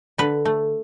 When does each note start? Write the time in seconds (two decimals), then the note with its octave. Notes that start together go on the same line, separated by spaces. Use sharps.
0.18 D3 B4
0.45 A3